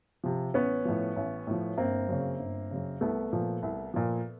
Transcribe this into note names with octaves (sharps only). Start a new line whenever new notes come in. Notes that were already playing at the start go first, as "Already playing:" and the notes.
C3 F3
A1 B3 C#4
A2 F3
A1
A2 F3
G1 A#3 C4
F#2 C#3
G1
F#2 C#3
C2 A3 B3
A#2 F3
C2
A#2 F3